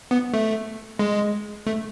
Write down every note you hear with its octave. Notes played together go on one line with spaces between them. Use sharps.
B3
A3
G#3
A3